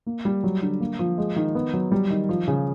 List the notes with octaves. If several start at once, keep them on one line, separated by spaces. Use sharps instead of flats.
A#3
G3
F#3
D3
A#3
F3
G#3
D#3
B3
F#3
G3
D#3
F3
C#3